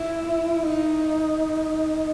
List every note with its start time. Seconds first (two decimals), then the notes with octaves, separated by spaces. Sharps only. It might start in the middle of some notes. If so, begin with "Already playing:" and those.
Already playing: E4
0.63 D#4